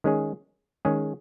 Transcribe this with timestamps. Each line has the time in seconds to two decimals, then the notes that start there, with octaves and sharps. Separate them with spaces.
0.04 D#3 G#3 C#4 G#4
0.85 D#3 G#3 C#4 G#4